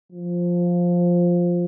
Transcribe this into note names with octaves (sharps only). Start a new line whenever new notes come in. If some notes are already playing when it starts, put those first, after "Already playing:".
F3